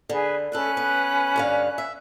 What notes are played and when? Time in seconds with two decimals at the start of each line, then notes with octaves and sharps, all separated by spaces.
0.09 D3 G#4 B4
0.52 D#2 A3 C#4 A4 B4 F#6
0.77 B3
1.36 G2 D3 F5
1.78 E5